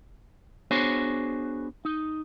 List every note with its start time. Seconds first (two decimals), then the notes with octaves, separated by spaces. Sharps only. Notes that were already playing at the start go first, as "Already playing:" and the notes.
0.71 B3 D4 F#4 G#4 C5 C#5
1.85 D#4